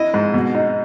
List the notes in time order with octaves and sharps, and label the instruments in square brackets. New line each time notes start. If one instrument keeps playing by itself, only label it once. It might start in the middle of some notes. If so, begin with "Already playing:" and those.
Already playing: [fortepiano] E4 D#5
G#2
B2
D#4